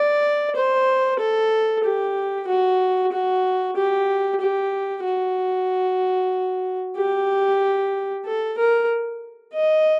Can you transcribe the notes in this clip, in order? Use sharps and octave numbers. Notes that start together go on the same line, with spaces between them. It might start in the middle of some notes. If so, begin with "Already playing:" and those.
Already playing: D5
C5
A4
G4
F#4
F#4
G4
G4
F#4
G4
A4
A#4
D#5